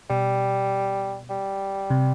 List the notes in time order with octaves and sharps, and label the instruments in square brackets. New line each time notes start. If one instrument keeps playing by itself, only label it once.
[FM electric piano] B2 [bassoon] G3
[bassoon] G3
[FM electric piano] C3